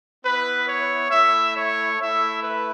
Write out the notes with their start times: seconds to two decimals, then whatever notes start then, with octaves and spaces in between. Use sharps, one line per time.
0.24 B3 E4 B4
0.67 C#5
1.11 A3 E4 E5
1.55 C#5
2.00 A3 E4 E5
2.43 B4